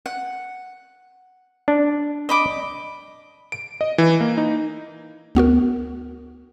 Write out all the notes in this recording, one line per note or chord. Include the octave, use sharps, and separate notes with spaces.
F#5
D4
D#5 B5 D6
D7
D#5
E3
A#3
D#4
D2 B3 F#4 A#4